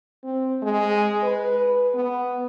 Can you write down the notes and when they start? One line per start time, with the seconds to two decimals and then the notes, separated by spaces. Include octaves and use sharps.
0.23 C4
0.62 G#3
1.23 B4
1.94 B3